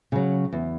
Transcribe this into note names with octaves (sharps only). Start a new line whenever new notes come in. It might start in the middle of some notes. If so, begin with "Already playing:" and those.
C#3 F#3
E2